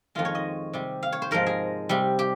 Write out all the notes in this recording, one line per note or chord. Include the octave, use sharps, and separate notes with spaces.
F2 D#3 G#3 F4
C#5
D#5
C3 G3
F5
C#5
C5
G#2 F3 G#3 A#4
G#4
C3 G3
G4